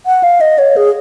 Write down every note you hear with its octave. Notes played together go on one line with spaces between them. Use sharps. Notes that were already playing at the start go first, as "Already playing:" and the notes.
F#5
F5
D#5
C#5
G#4